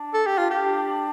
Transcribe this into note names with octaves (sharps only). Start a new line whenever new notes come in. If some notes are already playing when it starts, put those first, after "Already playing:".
Already playing: D4
A4
G4
D4 F4
G4